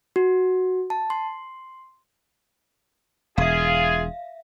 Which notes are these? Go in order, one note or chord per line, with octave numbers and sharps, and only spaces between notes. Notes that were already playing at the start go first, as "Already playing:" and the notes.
F#4
A5
C6
E1 F4 G#4 E5 F5